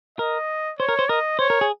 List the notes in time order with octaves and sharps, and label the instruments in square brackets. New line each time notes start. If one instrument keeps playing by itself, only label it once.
[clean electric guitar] A#4 [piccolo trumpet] D#5
[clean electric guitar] C5 [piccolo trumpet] C#5
[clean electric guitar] A#4
C5
[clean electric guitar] A#4 [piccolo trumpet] D#5
[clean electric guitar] C5 [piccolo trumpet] C#5
[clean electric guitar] A#4
G#4